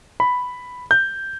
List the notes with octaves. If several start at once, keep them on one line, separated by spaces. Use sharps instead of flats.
B5
G6